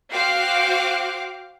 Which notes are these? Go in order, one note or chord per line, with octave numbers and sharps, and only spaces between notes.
F#4 C5 F5 G5 D6